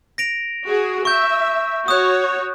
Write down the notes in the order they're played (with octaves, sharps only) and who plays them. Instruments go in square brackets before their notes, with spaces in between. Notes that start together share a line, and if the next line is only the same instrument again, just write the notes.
[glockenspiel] A#6 D7 F7
[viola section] F#4 G#4
[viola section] E5 [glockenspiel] C#6 G6
[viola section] F#4 C#5 [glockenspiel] D#6 F#6